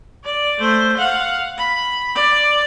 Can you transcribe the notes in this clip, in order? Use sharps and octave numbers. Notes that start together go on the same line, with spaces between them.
D5
A3 C5
F5 F#5
B5
D5